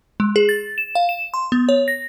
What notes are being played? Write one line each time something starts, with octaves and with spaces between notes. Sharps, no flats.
G#3
G#4
A6
E7
F5
E7
C6
B3
C#5
A#6